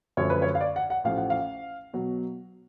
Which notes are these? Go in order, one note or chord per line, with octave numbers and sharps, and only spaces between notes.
F#2 D3 F3 A3 C#5
B4
C#5
F5
D5
F#5
F#5
A1 A2 F3 A3 F5
F#5
F5
B2 F#3